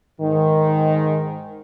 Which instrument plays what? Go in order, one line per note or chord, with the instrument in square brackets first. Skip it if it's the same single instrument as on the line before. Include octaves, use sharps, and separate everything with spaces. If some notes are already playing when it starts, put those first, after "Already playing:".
[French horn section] G#2 D#3